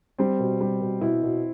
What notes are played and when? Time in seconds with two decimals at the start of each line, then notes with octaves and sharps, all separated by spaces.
0.18 G3 C4
0.39 B2
0.61 G3
0.81 B2
1.01 B2 E4
1.23 B2